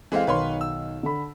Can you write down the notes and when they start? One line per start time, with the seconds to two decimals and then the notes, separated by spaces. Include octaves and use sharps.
0.12 E3 G#3 C4 A4 F5
0.27 B1 D#3 B4 C#5 F5 C6
0.61 E6
1.03 D3 A4 B5